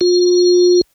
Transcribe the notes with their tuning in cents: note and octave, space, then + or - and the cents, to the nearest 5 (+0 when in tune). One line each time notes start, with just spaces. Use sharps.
F4 +35